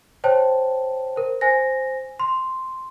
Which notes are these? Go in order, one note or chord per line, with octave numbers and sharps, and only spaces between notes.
C5 C#5 G5 A5
A#4 C5
C5 G#5 A#6
C6